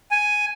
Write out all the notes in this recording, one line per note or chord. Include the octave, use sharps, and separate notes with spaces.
G#5